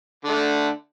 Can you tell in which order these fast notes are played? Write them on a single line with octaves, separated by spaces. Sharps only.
D3 A3 D4